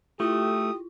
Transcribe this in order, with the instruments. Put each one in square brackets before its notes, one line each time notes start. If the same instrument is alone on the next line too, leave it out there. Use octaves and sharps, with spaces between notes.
[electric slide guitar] A3 [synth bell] E4 F4 [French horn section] G4 [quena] D#6